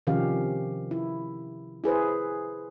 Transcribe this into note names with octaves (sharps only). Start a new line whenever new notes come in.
C3 D#3 F3 C#4 G4 F5
E4
E4 G#4 B4 C5